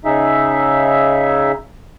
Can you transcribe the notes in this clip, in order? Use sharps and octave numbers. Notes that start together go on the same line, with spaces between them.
C#3 D#4 G#4 E5